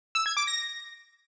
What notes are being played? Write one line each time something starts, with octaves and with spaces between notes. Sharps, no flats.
E6
G#6
D6
A#6